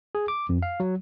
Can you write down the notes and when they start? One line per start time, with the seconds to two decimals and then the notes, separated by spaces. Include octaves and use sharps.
0.15 G#4
0.28 D6
0.49 F2
0.63 F5
0.80 F#3